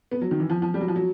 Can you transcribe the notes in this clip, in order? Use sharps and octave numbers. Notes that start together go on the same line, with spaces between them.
B3
F#3
D#3
E3
F3
F3
G3
F#3
F3
F#3